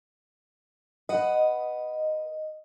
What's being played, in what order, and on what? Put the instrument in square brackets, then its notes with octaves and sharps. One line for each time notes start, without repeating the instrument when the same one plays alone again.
[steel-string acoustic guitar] B4 F#5 [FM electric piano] D#5